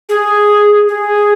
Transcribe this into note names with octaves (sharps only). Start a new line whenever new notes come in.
G#4
G#4